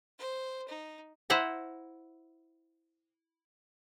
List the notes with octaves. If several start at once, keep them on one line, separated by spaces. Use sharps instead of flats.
C5
D#4
E4 C5 F#5 A#5